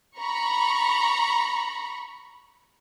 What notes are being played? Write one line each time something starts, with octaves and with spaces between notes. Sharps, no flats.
A#5 B5 C#6